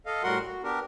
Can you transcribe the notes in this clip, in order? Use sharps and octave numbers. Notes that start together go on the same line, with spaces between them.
A4 D#5 F5
A2 G3 F#4 A#4 F#5 C6
F#4
B3 D4 G4 A#4